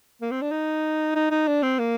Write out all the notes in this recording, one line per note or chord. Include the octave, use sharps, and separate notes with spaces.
A#3
C4
D4
D#4
D#4
D#4
D4
C4
A#3